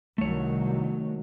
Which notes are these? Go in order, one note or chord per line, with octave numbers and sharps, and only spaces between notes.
C2 D#3 F#3 A3 C#5